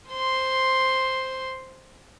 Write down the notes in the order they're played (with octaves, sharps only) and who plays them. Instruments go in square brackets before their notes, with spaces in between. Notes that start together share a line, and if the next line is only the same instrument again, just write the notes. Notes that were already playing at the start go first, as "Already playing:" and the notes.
[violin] C5 C6